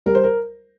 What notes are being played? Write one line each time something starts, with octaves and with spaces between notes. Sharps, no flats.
G3 A#4
C5
A#4